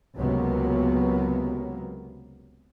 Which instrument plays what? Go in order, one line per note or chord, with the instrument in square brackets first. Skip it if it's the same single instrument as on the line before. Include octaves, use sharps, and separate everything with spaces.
[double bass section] C#2 C3 F#3 A#3 B3